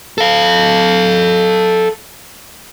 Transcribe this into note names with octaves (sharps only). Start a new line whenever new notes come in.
A4 F5